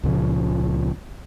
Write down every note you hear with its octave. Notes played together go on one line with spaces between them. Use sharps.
C#2 A#2 C#3 F3